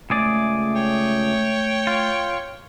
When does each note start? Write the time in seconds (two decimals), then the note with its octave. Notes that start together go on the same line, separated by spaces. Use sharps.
0.10 C#2 A3 G#4 D5
0.76 C#5 G5
1.87 F4